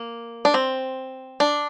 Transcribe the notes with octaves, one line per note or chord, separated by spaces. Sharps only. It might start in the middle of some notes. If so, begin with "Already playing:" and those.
Already playing: A#3
D4
C4
D4